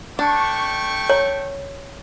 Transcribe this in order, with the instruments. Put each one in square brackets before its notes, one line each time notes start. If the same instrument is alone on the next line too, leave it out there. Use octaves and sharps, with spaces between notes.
[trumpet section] A3 G5 C#6 [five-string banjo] D4
[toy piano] C#5